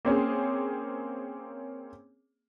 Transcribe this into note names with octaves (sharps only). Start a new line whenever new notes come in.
A#3 C4 C#4 G#4